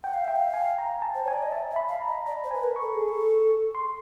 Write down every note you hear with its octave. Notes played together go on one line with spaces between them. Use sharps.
F#5 G5
F5
E5 G5
F5
G#5
A#5
A5
C5
C#5 G#5
D5
D#5
E5 A5
E5
B5
F5
A#5
D#5
D5 A#5
C5
B4 G#5
A#4
C#6
A4
G#4
A4
C6